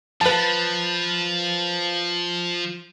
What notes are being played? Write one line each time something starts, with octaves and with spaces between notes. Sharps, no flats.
F3 B4 A5